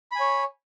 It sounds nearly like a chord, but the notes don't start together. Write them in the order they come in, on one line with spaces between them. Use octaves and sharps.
B5 G#5 C#5